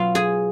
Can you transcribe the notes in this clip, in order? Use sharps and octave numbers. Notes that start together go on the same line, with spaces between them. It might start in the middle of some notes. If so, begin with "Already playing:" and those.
Already playing: B2 F#3 B3 F4 F5
G#4 G#5